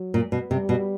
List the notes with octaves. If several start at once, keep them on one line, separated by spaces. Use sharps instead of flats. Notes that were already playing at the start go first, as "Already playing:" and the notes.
Already playing: F#3
A#2
B2
C3 G3
B2